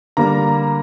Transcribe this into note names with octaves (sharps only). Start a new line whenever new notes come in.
D3 G3 A#3 A#5